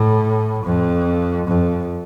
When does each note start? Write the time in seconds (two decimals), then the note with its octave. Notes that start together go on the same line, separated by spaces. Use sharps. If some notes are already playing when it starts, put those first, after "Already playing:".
Already playing: A2
0.64 F2
1.47 F2